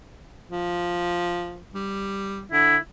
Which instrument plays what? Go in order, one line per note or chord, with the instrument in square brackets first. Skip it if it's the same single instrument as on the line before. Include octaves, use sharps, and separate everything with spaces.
[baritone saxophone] F3
G3
[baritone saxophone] D3 [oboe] E4